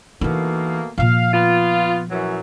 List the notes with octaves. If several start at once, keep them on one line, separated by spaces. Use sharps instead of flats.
B2 E3 A3 A#3 D#4
A#2 F3 F5
B3 F4
F#2 E3 F#3